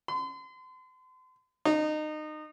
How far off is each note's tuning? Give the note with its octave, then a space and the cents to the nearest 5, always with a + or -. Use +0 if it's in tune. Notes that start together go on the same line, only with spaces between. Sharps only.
C6 -40
D#4 -25